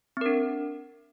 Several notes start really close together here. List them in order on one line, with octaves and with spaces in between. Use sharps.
C4 A#4 D4